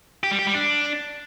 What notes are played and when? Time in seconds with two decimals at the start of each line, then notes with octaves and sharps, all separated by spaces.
0.23 G4
0.31 G3
0.39 G4
0.47 G3
0.55 D4